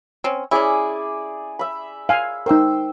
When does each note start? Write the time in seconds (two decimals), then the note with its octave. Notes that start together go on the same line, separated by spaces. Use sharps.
0.24 C4 C#4
0.51 C#4 E4 G#4 D5 G#5
1.59 E5 B5
2.09 F5 G#5
2.46 D#4 A#4 C5 G5 E6